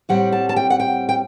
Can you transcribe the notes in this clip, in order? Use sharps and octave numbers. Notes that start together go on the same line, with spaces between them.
A2 G3 C4 F#5
A5
A5
G5
F#5
G5
G5